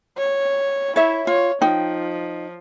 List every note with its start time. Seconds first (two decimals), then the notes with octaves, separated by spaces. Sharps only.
0.17 C#5
0.96 E4 C#5 E5
1.27 F4 C#5
1.61 F3 D#4 G5